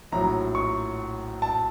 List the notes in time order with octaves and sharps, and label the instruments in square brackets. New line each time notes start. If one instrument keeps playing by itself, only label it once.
[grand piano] A#1 A2 F#3 A#5
C#6
A5